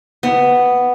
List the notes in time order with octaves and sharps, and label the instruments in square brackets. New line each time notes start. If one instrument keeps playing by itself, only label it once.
[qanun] B3